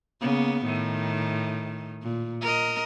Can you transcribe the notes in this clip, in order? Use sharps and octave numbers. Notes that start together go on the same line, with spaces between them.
C#3 A#3 B3
A2 D#3
A#2
A#4 D#5